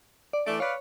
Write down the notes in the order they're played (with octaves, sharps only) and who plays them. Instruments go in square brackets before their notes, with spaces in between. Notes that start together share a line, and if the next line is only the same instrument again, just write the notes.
[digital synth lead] D5
[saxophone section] E3 A3 D5 [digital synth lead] D7
[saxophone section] B4 D5 F5 [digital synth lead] C#5